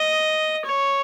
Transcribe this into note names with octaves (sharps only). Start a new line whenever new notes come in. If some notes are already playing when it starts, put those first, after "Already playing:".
Already playing: D#5
C#5